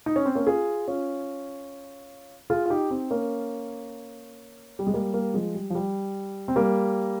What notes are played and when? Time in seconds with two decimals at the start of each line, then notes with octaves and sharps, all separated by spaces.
0.06 D#4
0.16 C#4
0.25 C4
0.35 A#3 C#4
0.47 F4 G#4
0.87 C#4 F4
2.50 F4 G#4
2.66 F4
2.70 D#4 G4
2.90 C4 D#4
3.11 A#3 C#4
4.79 G3
4.87 G#3
4.94 G3 A#3
5.14 G3 A#3
5.34 F3 G#3
5.54 G3
5.70 F3
5.75 G3
6.48 C4
6.56 G3 A#3